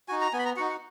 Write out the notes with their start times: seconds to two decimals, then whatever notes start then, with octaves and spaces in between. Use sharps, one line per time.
0.08 D#4 F#4 G#5
0.21 A#5
0.33 B3 G#5
0.39 B5
0.45 A#5
0.56 F#4 F#5
0.59 D#4
0.70 F#5